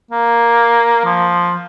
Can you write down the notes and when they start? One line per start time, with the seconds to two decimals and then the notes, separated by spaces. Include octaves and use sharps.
0.11 A#3
1.05 F3